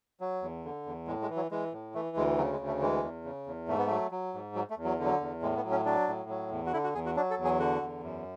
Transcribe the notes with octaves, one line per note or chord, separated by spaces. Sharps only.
F#3
E2
D3
E2
A2 G#3
G#3
E3
F#3
E3 G#3
A2
E3 A3
D2 G#3
C#3 F#3
G#3
D2
A3
E3 G#3
E2
C#3
E2
G#2 A3
B3
F#3 A3
F#3
G#2
F#3
A3
E2
F#3
D3 F#3
E2
A2 G#3
B3
F#3
C#4
F#3 D4
A2
F#3
E2
F#4
D3 E4
F#4
E2 G#4
F#4
F#3 D4
A4
E2
G#4
D3 F#4
E2
F#2